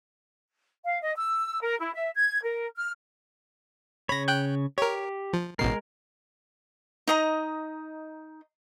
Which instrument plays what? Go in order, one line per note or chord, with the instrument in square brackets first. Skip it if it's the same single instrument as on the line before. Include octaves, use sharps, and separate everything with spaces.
[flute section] F5
D#5
E6
A#4
E4
E5
G#6
A#4
F6
[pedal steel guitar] C#3 C#5 [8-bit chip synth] B5 A#6
[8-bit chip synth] G5 F#6 G6
[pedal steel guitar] G4 [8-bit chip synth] A#4 C#5
[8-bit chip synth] F3
[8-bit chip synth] A1 B2 C7 [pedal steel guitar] G#3 A#4
[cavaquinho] D#4 D#5 A#5